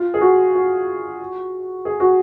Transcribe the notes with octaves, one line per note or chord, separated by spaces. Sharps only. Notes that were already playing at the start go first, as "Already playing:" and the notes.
Already playing: F4
G#4
F#4
F#4
G#4
F#4